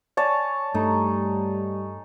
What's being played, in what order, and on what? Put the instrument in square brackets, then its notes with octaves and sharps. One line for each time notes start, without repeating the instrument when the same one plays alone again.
[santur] C#5 G#5 A5 [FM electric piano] D5
[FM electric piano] G2 A3 [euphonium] G3 [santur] D#4